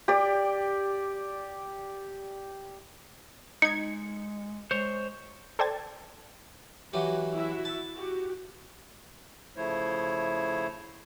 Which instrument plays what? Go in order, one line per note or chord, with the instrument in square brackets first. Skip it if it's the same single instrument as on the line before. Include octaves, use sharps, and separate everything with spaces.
[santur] G4 D5
[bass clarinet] G#3 [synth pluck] D#4 G#6 [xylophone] C#7
[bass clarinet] G#3 [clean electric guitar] C5 C#5
[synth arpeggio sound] A4 C5 D5 G5 G#6 A6
[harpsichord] E3 F#3 G4 [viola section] F#4
[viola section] E4 F#4 E5
[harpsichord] A5
[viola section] F#4 G4
[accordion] C#3 F3 A3 E4 C5 C#5